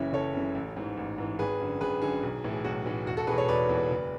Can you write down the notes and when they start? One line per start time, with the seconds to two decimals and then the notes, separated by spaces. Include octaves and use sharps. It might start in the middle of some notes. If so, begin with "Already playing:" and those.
Already playing: F#1 F#2 C#3 E3 C#5 E5
0.13 F#1 A4 C#5
0.34 F#2 C#3 E3
0.55 A1
0.77 G#2 E3
0.97 A1
1.18 G#2 E3
1.39 G#1 G#4 B4
1.60 F#2 D3
1.81 G#1 G#4 B4
2.02 F#2 D3 G#4
2.23 B1
2.44 A2 E3
2.53 G#4
2.64 B1 F#4
2.86 A2 E3
3.06 E1 F#4
3.17 F#4 A4
3.27 E2 B2 G#4 B4
3.38 A4 C#5
3.48 E1 B4 D5
3.69 E2 B2
3.90 F#1